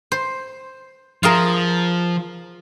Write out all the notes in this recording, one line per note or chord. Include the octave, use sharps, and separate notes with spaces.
C5
F3 F4 G#4 A#4